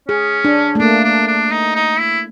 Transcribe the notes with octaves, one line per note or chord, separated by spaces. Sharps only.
C#4 G#4
D4
A3
A#3 D4
D4
D4
D#4
D#4
E4